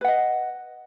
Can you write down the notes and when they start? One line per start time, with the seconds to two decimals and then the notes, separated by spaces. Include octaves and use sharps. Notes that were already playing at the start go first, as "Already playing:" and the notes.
0.01 B4
0.04 F#5
0.08 D#5